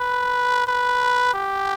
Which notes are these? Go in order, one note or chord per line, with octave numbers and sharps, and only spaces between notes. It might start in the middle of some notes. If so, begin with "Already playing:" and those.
Already playing: B4
B4
G4